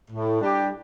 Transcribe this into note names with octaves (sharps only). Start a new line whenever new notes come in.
A2
G3 D4 G4